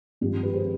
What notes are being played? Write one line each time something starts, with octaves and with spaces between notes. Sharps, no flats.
G#1 G2 F3 C4 F4 G4
G4 B4
G#4 C5